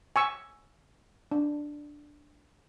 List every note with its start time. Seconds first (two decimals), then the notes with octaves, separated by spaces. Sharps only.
0.16 G#5 C#6 E6
1.32 D4